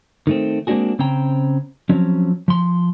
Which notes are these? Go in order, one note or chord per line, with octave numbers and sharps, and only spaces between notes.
D#3 A3 C4
G#3 A#3 C4 D4 F#4 G#4
C#3 C4 C#4 C5 G5 A#5
F3 F#3 C4 C#4
F3 C6